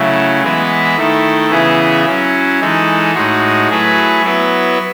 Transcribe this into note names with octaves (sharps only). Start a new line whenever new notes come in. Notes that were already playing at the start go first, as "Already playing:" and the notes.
Already playing: C#3 F#3 A3 E4
E3 G#3 B3 E4 B4
D#3 A3 E4 A4
C#3 E3 B3 E4 G#4
F#3 C#4 E4
E3 G#3 D#4 A4
A2 G#3 D#4 F#4
F#3 A3 E4 G#4 B4
F#3 B3 E4 B4